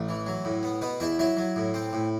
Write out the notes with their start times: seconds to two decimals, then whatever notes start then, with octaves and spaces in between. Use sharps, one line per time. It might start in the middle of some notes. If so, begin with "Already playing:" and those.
Already playing: A1 A3
0.09 E3
0.27 F#3
0.45 A2
0.63 B3
0.81 B2 B3 B4
1.00 E2 E4 E5
1.19 F#3 E4 E5
1.37 F#3
1.56 A2
1.74 C4
1.93 A2